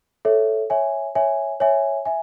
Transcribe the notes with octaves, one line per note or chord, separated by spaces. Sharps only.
A4 C#5 E5
C#5 E5 G#5
C#5 E5 G#5
C#5 E5 G#5
E5 G#5